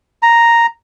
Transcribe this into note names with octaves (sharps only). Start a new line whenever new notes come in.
A#5